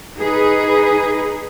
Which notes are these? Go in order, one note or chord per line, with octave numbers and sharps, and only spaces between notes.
D#4 G#4 B4